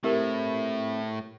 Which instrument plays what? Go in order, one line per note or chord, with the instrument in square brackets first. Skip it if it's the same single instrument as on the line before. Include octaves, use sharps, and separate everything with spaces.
[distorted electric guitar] A2 [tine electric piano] C4 E5 [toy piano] E4 G4 A#4